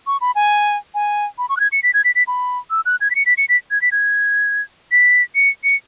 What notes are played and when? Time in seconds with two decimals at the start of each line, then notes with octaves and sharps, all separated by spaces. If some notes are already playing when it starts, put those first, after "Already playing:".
0.07 C#6
0.21 B5
0.35 G#5
0.94 G#5
1.38 B5
1.49 C#6
1.57 F#6
1.60 G#6
1.72 C#7
1.83 B6
1.94 G#6
2.05 B6
2.15 B6
2.27 B5
2.71 E6
2.86 F#6
3.01 G#6
3.11 B6
3.15 C#7
3.26 B6
3.38 C#7
3.49 B6
3.71 G#6
3.82 B6
3.92 G#6
4.92 B6
5.35 C#7
5.64 C#7